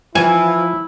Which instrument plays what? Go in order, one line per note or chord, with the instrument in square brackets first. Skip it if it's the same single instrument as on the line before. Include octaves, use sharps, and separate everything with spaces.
[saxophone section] E3 [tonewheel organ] F3 [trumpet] E4 [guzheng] G#5